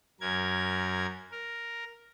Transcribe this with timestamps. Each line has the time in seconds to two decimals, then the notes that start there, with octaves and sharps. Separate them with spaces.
0.21 F#2 A#4 G#6
1.31 A#4